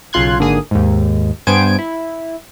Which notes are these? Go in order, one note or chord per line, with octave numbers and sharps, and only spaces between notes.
B1 C#3 F4 C6 F#6 G#6
G#1 D3 A#3 G#4 D#6
D#2 G#2
G2 B3 C5 G#5 G#6 D7
E4